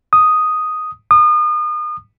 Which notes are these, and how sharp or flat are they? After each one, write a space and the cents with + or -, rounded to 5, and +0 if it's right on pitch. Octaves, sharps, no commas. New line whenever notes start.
D#6 +0
D#6 -35